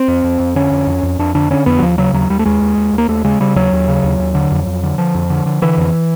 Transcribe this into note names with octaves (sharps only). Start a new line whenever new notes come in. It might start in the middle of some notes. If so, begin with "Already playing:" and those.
Already playing: C4
F2
F2
F2
D3 C#4
F2
F2
F2
F2 D4
D3 D4
D3 C#4
F2 B3
F#3
D#2 F3
C#3 F#3
D#2 F#3
D#2 G3
A3
D#2 G#3
D#2
D#2
D#2
A#3
D#2 A3
C#3 G#3
C#3 G3
D#2 F#3
D#2
C#3
D#2
D#2
D3
F2
F2
D3
D3 F3
F2
D3
D3
D3 E3
F2